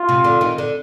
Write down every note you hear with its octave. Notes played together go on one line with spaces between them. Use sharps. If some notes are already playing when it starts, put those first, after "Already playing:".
Already playing: F4
C3
D3
D#3
D3